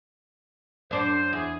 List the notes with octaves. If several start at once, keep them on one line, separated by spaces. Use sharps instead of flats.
F#2 D4 C5
E2 G#4